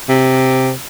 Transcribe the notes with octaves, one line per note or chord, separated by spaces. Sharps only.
C3